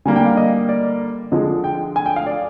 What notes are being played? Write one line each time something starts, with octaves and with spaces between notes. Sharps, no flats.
D3 G3 A#3 D4 G#5
G5
F5
D#5
D5
D3 F3 G#3 D#5
G5
G#5
G5
F5
D5